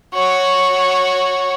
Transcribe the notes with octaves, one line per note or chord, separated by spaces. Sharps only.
F#4 C#5